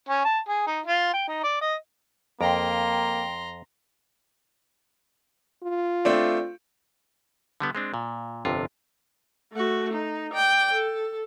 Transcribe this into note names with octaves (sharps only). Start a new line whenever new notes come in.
C#4
A5
G#4
D#4
F4
G5
D#4
D5
D#5
F2 A#3 G5 A#5 C6
F4
A3 C4 D4
D3 G3 B3
G#3 C4 D4
A#2
G1 F2 C3 F4
A3 F#4
D#4
D5 G5
A4